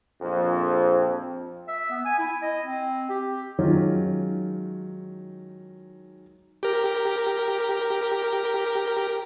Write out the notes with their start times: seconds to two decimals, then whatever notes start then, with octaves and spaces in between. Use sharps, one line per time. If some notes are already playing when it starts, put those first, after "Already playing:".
0.22 A#1 F2
1.68 E5
1.91 B3
2.05 G#5
2.19 E4
2.42 D#5
2.65 C4
3.09 G4
3.59 D#3 F#3 G#3 C#4 D#4 F4
6.63 G4 A#4